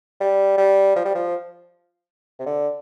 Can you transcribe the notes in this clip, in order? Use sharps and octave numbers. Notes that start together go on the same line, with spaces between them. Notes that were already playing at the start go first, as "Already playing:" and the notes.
G3
G3
F3
G3
F3
C3
D3